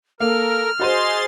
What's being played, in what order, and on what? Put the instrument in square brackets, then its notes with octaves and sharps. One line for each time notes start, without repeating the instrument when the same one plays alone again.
[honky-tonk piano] A#3 [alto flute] A4 [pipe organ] A#4 [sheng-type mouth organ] F6
[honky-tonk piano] F#4 C5 D#7 [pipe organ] G#4 C6 A6 [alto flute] D#5